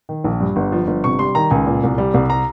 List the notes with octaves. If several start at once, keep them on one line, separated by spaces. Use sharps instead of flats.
D#3
A#1
G2
G1
F3
G1
C3 C#6
G3 C6
D#3 A#5
C#2 G#5
A#2
C2
G3
C2
A#5